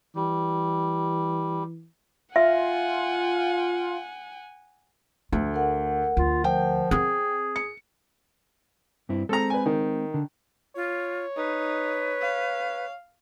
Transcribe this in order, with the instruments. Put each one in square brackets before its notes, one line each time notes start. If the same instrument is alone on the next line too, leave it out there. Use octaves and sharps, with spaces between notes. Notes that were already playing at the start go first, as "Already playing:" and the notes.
[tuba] E3 [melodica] G3
[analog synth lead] F4 [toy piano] E5 [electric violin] F#5 G#5
[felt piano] D2 [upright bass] A3
[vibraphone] A#4 F#5
[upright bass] D2 [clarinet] F4
[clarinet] F3 [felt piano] G5
[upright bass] C4 [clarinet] G#4
[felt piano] C#7
[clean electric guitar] G2 C4 E4
[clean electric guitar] G#3 C4 [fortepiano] A4 A#5
[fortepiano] B4 G#5
D#3
[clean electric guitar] D3
[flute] F4 [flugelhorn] C#5
[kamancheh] D#4 [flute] B4
[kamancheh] F5